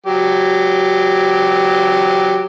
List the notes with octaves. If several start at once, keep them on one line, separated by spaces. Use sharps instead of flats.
F#3 G4